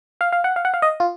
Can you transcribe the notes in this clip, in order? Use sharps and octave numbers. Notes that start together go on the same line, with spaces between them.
F5
F5
F#5
F5
F#5
F5
D#5
F4